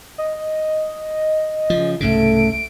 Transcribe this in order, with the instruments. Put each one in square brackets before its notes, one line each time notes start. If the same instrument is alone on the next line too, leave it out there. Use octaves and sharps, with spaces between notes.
[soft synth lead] D#5
[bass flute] C#3 [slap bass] F3
[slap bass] C2 G#2 C#3 [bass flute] A3 [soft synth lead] D7